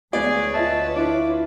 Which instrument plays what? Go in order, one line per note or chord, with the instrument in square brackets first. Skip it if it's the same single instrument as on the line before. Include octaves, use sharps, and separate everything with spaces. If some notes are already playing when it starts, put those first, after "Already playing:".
[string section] D2 B4 C#5 [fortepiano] G#3 B3 D5 [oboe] G#4
[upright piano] F4 D#5 E5 [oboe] A5
[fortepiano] D4 [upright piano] E4 F4 [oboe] D6